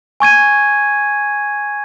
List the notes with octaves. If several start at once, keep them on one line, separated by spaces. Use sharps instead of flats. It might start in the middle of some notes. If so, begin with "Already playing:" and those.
G#5 C#6 G#6 D#7